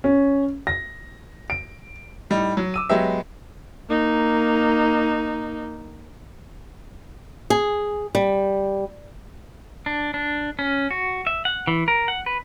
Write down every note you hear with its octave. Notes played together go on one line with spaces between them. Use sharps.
C#4
A#6
D7
A2 G3 D#4
F#3
D6 E6 D#7
F#3 G#3 B3 G4 E5
A#3 D#4
G#4
G3
D4
D4
C#4
F#4
E5
F#5
E3
A#4
F#5
B4